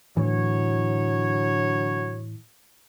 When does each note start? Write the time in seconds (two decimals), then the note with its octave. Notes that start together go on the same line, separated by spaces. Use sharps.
0.17 A2 D3 E3 F#3 C#5